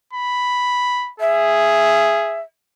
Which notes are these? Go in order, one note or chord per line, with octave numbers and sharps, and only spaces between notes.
B5
G#4 E5